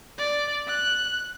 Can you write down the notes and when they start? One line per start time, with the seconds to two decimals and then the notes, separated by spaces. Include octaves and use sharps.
0.18 D5
0.67 F#6